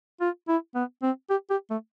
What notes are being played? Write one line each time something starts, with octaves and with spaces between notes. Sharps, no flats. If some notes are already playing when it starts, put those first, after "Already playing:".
F4
E4
B3
C4
G4
G4
A3